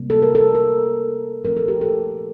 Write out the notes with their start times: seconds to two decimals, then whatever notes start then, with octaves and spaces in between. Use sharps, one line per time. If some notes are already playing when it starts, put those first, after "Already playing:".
Already playing: C3 G3 A#3
0.10 A4
0.22 A#4
0.35 A4
0.55 A#4
1.44 A#2 F3 A3 C4 A#4
1.57 A4
1.68 G4
1.81 A4